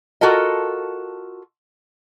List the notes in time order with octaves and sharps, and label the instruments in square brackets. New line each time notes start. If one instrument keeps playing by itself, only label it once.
[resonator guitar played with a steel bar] F4 F#4 A4 A#4 D#5